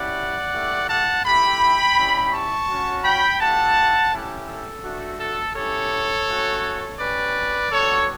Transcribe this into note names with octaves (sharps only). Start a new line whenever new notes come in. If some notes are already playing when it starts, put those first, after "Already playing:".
Already playing: C#4 E4 G4 D5 F#5
A3 E4 G4
F#5 A5
A3 E4 G4 G5 B5
G3 C#4 E4 G4
A5 C#6
C#4 F#4
G5 B5
A3 E4 G4 F#5 A5
A3 C#4 E4 G4
A4
A3 D4 F#4
A4
C#4 E4 G4 A4 C#5
A3 C#4 F#4
C#4 G4 B4 D5
G3 B3 D4 F#4 A4 C#5